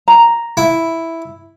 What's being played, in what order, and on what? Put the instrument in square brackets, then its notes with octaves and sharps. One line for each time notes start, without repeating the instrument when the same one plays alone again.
[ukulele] A#5
[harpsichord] E4